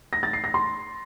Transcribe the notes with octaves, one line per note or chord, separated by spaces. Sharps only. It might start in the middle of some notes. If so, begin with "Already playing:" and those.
A#6
A6
C7
A#6
C6